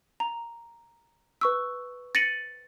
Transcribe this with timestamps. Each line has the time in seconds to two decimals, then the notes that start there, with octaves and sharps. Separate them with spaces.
0.20 A#5
1.41 B4 C#6 E6
2.15 A6 A#6 C#7 D#7 F#7